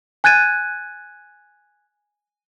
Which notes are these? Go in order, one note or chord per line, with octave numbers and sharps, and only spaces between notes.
G#5 F#6 G#6 A6 D#7